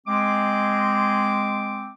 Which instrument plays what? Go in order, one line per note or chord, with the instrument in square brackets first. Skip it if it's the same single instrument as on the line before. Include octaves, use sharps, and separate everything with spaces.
[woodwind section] G#3 C4 D6